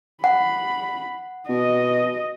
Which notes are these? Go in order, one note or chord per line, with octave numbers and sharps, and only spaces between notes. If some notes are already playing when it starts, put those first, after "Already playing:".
F#5 B5
B2 D#5